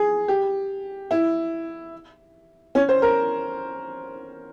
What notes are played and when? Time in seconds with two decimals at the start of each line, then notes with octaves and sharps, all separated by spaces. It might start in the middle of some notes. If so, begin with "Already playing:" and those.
Already playing: G#4
0.28 G4
1.11 E4
2.75 C#4
2.89 C5
3.02 A#4